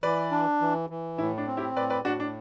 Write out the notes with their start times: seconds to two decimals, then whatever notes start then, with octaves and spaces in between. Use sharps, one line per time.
0.03 E3 B4 D5
0.31 D4
0.61 E3
0.90 E3
1.18 A2 E4
1.38 D4
1.47 C4
1.57 E4 G4
1.76 A2 B4 D5
1.90 B4 D5
2.05 A2 D4 F#4
2.20 D4